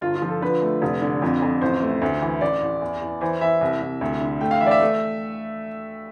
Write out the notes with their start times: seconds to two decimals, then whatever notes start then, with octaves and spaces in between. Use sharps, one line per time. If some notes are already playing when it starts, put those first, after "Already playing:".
0.01 G1 F4
0.15 F4
0.22 F3
0.28 A4
0.41 D3 B4
0.62 A3
0.82 F1
1.02 D3
1.22 F2
1.42 F2
1.62 A1 C5
1.82 A3
2.01 D2
2.22 E3
2.41 A1 D5
2.61 A1
2.81 E2
3.01 E2
3.21 E3 C5
3.41 E3 E5
3.61 C2
3.81 C2
4.01 D2
4.21 D3
4.41 A3 G5
4.51 F5
4.60 E3 E5
4.66 D5
4.71 E5
4.81 A3